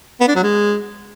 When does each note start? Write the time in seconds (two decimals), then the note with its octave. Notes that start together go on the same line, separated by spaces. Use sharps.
0.20 B3
0.28 D4
0.36 F#3
0.43 G#3